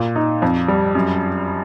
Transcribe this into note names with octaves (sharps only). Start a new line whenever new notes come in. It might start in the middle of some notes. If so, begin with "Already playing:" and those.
Already playing: A#2
D#4
F2
G3
F#2